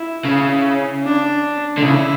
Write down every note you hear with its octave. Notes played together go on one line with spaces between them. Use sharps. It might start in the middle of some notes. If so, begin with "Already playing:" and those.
Already playing: E4
C#3
D4
D3
C#3 E4